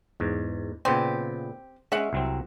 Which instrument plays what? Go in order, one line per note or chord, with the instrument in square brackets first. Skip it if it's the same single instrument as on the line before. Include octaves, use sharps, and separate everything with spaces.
[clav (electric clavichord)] E2 G#2
[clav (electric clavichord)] A#2 C#3 B3 [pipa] C4 G4
[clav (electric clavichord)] G#3 C#4 [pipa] E5 F#5
[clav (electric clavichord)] C2 F#3 C4